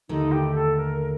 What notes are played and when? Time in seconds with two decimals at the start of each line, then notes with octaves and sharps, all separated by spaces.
0.09 D#2 D3 A3 D#4
0.32 G4
0.54 A4
0.76 A#4